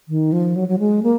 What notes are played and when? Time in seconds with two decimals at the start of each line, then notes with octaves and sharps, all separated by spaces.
0.09 D#3
0.32 F3
0.56 F#3
0.68 F#3
0.79 G#3
1.03 A#3